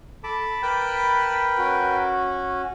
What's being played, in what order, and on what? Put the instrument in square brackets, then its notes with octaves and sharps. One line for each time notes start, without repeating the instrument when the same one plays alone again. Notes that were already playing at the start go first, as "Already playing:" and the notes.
[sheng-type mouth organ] A4 [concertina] A5 B5 D6
[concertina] A#4 B4 G5 [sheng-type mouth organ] A5 B5
[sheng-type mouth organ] C#4 F#4